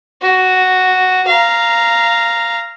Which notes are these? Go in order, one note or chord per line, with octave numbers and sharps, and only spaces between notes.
F#4
F5 A#5